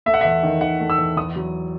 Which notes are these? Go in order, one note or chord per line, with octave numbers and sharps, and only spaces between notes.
A3 E5
F#5
E2 E5
D#3
D#3 F#5
A3
E6
E2
E2 D#6
F#3